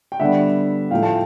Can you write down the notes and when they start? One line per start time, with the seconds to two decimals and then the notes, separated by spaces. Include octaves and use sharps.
0.12 G5
0.20 D3 G3 B3 D4 E5 F#5
0.91 A2 F3 A3 F5 G5
1.03 G5 A5